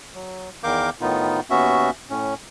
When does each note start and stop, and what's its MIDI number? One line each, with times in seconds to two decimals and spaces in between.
0.14 0.49 54
0.64 0.90 40
0.64 0.90 51
0.64 0.90 70
0.64 0.90 77
0.64 0.90 86
0.64 0.90 91
1.01 1.40 45
1.01 1.40 51
1.01 1.40 59
1.01 1.40 63
1.01 1.40 65
1.50 1.90 39
1.50 1.90 59
1.50 1.90 61
1.50 1.90 66
1.50 1.90 76
2.10 2.34 45
2.10 2.34 61